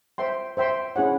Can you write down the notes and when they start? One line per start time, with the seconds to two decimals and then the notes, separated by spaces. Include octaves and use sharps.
0.18 C5 E5 G5 C6
0.57 C5 E5 G5 C6
0.96 C#4 E4 G#4 C#5 F#5